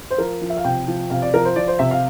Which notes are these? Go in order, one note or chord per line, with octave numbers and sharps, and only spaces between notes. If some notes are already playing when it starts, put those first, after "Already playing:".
C5
F3 A#4
F3
E5
F5
C3 G5
F3
C3 F5
D5
F3 A#4
C5
F3 D5
C5
C3 E5
F5